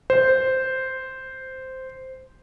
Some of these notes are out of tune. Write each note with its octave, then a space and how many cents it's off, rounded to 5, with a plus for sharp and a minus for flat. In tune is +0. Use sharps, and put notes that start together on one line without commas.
C5 -5